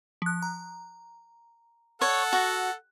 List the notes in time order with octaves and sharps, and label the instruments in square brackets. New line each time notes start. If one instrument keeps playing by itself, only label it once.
[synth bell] F3 F#6
A#5
[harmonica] A4 F#5 [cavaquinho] C#5
[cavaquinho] F#4